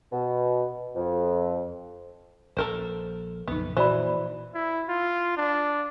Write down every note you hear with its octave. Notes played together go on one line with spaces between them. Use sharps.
B2
F2
A#1 A4 A#4 C5
F#1 B1 A#2 F3 B3 D#4
A#2 E3 A#3 F#4 C5 D5 B5
E4
F4
D4